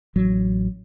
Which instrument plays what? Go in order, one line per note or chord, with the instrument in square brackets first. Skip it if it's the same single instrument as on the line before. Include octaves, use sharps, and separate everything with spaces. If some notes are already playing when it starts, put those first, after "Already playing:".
[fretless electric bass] A1 F#3